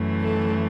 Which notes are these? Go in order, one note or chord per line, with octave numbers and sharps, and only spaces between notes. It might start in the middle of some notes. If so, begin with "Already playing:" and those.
Already playing: F#2 E3 A3
A4